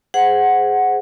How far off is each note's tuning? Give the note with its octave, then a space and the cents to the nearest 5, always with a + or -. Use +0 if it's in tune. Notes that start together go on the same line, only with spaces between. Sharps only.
G#4 +0 C5 -15 F#5 +0